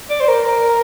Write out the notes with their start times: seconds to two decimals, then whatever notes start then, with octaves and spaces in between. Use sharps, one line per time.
0.10 D5
0.20 C5
0.28 A#4